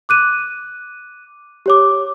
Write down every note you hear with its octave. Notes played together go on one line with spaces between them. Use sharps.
D6 F#6 D#7
G4 C#5 D6